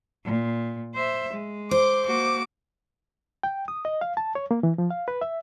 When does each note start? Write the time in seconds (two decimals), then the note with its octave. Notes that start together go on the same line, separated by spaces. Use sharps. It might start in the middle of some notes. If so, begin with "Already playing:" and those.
0.24 A#2
0.94 C5 E5
1.33 G#3
1.71 C5 D6
2.06 A#3 F#4 D6
3.43 G5
3.68 D#6
3.85 D#5
4.01 F5
4.17 A5
4.35 C#5
4.51 A#3
4.63 E3
4.78 F3
4.91 F5
5.08 B4
5.21 E5